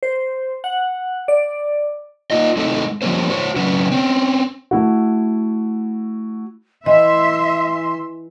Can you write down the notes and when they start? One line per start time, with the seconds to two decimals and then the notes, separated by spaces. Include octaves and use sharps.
0.03 C5
0.64 F#5
1.28 D5
2.31 A#3 D#4 F4 D#5
2.57 G#3 A3 C4 D#4 E4 A4
3.02 F3 G3 G#3 A#3 C#4 C5
3.30 F#4 C5 C#5
3.56 C#3 F#3 C#4 B4
3.91 C4 C#4
4.71 A3 E4 F#4
6.86 E3 D#5 E5 C6